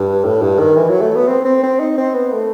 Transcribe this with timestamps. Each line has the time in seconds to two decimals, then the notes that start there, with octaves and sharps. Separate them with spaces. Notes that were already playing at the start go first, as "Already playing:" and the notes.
Already playing: G2
0.24 A2
0.41 G2
0.59 D#3
0.76 E3
0.89 F#3
1.02 A3
1.15 B3
1.28 C4
1.45 C4
1.63 C4
1.80 D#4
1.98 C4
2.14 B3
2.32 A3